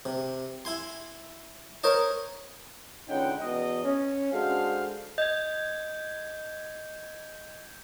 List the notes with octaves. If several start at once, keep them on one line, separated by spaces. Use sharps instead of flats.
C3
E4 G#5 C6
A#4 C5 C#5 D#5 A5
C#2 D3 C#4 D#4 F#5 G5
E2 B2 D#5
C#4
G#3 D4 F#4 A4 C5 F5
D#5 G6 G#6